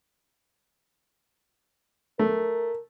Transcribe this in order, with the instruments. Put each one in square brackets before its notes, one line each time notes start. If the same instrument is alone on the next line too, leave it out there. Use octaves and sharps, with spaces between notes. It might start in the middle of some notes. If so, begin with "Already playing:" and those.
[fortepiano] A3 [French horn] A#4